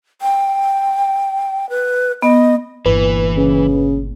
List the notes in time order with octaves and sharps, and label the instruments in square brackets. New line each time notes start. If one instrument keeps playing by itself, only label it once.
[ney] G5
B4
[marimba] B3 [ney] D#5
[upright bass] G1 A#2 [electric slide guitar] E3 [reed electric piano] B4
[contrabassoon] C#3